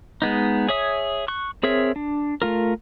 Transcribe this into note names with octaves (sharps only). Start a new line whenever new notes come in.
G#3 B3 D#4
G#4 C#5 E5 D#6
C#6 F#6
C4 G#4 A#4 C#5 E5
D4
A3 F4 A#4